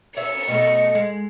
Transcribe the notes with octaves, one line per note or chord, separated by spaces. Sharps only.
C#5 E5 C#7
B2 A3 D#5
G#3